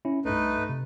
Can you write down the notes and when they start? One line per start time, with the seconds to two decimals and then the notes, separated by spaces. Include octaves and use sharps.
0.05 C#4 E4
0.25 C2 G2 A3 D#4 B4
0.69 C3